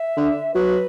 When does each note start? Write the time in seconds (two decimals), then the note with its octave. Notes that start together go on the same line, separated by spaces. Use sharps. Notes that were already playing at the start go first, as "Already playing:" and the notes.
Already playing: E5
0.17 D3
0.54 F#3 B4